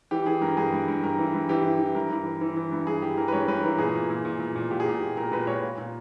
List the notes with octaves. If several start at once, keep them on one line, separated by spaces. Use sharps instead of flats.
E3 G4
E3 G#4
G2 A#4
G2 G#4
G2
G2
G2 A#4
E3
G2
E3 G4
E3
E3
G2 A#4
E3
E3
E3
E3
G2
G2 G#4
E3 G4
E3 A#4
B4
G2 C#5
G2 B4
E3 A#4
A#2 G#4
A#2
A#2
A#2
A#2
A#2
A#2 G4
G#4
A#2 G4
A#2
A#2 A#4
A#2 B4
A#2 C#5
A#2
A#2